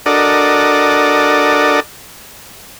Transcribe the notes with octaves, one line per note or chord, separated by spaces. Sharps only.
D4 F#4 A4 A#4 D5 D#5